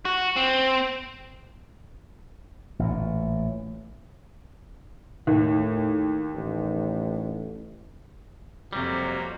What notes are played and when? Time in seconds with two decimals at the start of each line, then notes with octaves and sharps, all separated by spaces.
0.05 F#4
0.36 C4
2.79 A1 A#2
5.27 D#2 A2
6.35 A1
8.73 F2 C3 F#3 G3 A#3